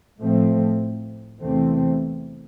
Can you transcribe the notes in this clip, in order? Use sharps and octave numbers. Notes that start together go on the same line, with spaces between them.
A2 F3 A3 C4
E2 C3 E3 A3 C4